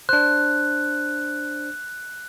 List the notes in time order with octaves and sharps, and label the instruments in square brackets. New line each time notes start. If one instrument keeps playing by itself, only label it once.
[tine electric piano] D4 C5 [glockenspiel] F#6